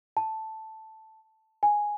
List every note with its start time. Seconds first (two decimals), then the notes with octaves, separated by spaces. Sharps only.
0.17 A5
1.63 G#5